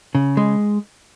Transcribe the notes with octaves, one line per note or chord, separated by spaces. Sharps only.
C#3
G#3